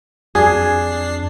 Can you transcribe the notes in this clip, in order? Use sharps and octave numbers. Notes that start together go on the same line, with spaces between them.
F2 D4 G#4 C7